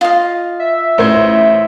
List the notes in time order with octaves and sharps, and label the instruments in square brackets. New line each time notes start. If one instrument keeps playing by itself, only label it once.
[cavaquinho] F4 D#5 F5
[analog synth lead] E5
[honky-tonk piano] A1 C5 G#6